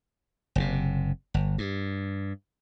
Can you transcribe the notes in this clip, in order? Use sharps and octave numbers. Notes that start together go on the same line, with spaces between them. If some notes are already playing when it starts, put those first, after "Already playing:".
F#1 A2 C3
G1
G2